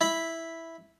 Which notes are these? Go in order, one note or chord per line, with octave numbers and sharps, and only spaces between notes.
E4 B5